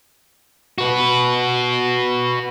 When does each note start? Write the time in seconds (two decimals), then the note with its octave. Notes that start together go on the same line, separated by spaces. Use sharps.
0.78 F#4 B4